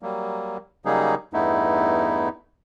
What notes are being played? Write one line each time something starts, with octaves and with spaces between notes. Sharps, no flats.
F#3 G3 A#3
C#3 F#3 G3 A#3 D#4 G#4
E2 G2 A3 B3 D#4 E4